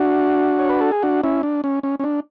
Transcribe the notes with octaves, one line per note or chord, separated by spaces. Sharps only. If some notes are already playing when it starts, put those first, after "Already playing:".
Already playing: D4 F#4
C#5
B4
A4
G#4
D4 F#4
C#4 E4
D4
C#4
C#4
C#4
D4